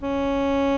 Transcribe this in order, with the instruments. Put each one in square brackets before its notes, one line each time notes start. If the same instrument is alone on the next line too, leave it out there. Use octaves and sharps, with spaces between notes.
[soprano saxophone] C#4